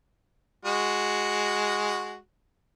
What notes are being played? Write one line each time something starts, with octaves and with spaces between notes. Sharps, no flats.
G#3 F#4